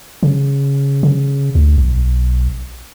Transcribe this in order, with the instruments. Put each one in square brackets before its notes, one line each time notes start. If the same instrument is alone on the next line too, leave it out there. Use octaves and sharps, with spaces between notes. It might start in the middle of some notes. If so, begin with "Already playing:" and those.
[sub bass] C#3
C#3
D2
B1